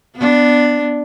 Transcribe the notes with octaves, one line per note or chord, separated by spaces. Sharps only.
B3 D4